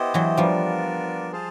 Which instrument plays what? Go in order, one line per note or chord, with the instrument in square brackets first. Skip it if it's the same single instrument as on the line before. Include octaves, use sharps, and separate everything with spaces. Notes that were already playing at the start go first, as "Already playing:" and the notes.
Already playing: [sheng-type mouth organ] B3 E4 G4 C5 D#5
[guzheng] E3 F#3
[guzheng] F3 G3 [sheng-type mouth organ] B3 D4 F4 A#4 D5
[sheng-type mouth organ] F4 G#4 C5 F5 A5